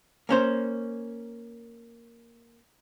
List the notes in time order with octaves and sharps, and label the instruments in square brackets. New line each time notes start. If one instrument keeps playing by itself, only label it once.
[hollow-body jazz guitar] A#3 C#4 C5